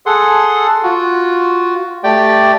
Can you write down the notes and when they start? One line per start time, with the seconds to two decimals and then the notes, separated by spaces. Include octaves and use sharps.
0.06 G#4 A4 F#5 C6
0.83 F4 F#4
2.04 A3 G4 D5 G5